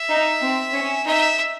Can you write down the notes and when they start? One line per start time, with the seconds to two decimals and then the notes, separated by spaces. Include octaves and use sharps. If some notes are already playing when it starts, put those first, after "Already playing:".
Already playing: E5
0.09 D#4
0.41 C4
0.73 C#4
1.06 D#4 E5